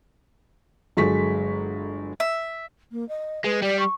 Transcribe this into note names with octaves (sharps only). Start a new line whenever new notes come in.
G1 F#3 G#3 A4 C#6 B6
E5
A#3
D#5
G#3 B4
G3 D5
C#6